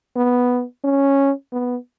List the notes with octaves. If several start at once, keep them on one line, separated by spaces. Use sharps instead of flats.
B3
C#4
B3